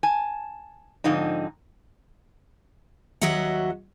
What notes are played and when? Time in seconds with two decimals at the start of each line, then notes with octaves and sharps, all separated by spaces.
0.03 G#5 A5
1.04 G#2 D3 F3 C4 D#4
3.21 D#2 F#3 F#4 D#5 E5 F#5